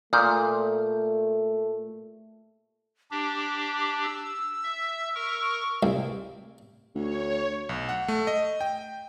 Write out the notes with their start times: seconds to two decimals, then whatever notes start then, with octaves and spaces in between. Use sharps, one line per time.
0.13 A#2 A3 D#6 F6 G6
3.11 D4 G4 D6
4.03 E6
4.64 E5
5.15 A#4 C#6
5.83 C2
6.95 D2 C#5
7.69 B1
7.89 F#5
8.08 A3
8.27 D#5
8.61 G5